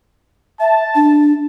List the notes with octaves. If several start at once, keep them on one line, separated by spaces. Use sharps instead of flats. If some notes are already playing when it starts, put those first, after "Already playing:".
E5 A5
D4